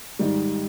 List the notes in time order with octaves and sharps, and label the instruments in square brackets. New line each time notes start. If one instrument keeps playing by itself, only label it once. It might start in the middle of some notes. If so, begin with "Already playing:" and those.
[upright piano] G#2 D#3 G3